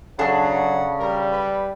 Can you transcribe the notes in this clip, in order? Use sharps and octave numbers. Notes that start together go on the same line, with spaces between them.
C#3 F#3 D4 G#4 A4 F#5
G3 A#4
B4